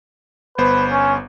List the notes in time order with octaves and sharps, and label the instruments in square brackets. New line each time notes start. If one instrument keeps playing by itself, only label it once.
[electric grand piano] G1 B3 C5 [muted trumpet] B4
[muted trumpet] C#4